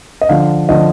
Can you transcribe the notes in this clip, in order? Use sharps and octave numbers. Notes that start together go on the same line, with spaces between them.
D#5
D3 F3 F5
D3 F3 D#5